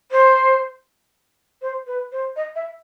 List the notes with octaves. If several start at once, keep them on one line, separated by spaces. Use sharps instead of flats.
C5
C5
B4
C5
D#5
E5